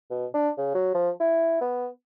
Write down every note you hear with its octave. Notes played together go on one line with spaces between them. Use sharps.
B2
D4
C#3
F#3
F3
E4
B3